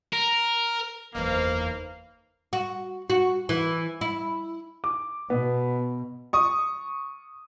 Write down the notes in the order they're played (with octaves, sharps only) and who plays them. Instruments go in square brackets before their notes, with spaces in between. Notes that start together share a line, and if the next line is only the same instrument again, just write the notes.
[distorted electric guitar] A#4
[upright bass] F#1 E2 [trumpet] A#3 [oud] D#4 B4 C5 [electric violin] F5
[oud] F#4
F#4
E3
E4
[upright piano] D6
[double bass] B2 [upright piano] B3
[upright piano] C#6 D#6